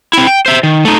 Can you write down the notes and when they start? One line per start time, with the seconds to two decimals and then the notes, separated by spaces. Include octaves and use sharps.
0.13 C4 E4
0.27 G5
0.46 C5 E5
0.63 D#3
0.85 A3 D#4